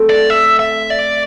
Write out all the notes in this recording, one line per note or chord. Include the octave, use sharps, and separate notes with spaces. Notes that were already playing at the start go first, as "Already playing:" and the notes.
Already playing: A3 C4
D5
E5
E5
D5